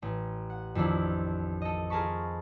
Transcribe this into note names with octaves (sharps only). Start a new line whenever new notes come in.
A1
F#5
F2 D#3 D4 E4
A4 D#5
F4 G#4 A#4 A5 B5 C#6